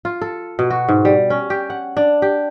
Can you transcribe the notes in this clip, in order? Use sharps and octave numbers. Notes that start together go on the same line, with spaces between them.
F4
A4
B2
F#4
G#2
G3
C#4
G4
F#5
D4
G4